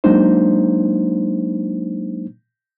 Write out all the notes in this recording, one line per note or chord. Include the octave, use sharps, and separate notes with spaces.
F#3 G#3 A#3 D4 D#4 C5